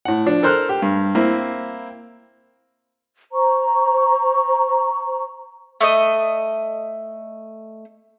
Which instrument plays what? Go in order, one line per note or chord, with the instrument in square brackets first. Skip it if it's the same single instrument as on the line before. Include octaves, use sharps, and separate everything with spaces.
[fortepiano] A2 F#5
F3 D4
A4 A#4 C5 C6 F6 F#6
G4
G2
A#3 C4 E4
[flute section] C5 A#5 C#6
[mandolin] A3 D#5